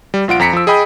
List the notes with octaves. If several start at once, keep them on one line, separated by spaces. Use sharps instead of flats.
G3
A#1 F4 F#5 D7
F2 A#5 B6 C#7
F3 E6
G#4 D#5 G5 B5 D#6 G6